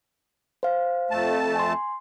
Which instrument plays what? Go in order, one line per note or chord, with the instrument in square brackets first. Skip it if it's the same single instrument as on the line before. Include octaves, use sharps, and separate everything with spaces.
[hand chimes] C5 F5
[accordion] F2 A3 A5
[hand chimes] G#5 C6